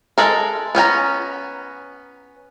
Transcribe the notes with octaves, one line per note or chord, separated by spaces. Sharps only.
G#3 A4 A#4
B3 C#4 G5 A#5